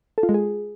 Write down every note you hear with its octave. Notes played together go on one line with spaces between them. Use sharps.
A4
F4
G#3
G#4